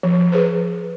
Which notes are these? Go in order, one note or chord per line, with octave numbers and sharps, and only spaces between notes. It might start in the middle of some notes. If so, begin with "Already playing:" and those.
F3
G#4 B4 C5